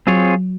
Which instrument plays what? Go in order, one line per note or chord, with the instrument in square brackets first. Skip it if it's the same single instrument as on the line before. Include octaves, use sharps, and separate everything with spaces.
[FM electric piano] F#3 [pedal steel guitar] C4 F4 G#4 C#5